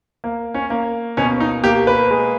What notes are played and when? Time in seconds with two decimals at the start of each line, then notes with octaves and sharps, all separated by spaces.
0.24 A#3
0.54 C#4
0.70 A#3
1.17 B2 C#4
1.40 D#4
1.64 A#3 G4
1.87 B4
2.10 G#3